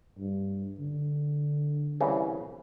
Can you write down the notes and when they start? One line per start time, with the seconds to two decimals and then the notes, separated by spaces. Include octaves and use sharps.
0.19 G2
0.80 D3
2.01 C2 C#3 E3